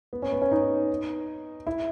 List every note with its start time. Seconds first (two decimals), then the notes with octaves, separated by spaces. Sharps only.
0.13 B3
0.22 C#4
0.32 B3
0.42 C#4
0.52 D#4
1.67 E4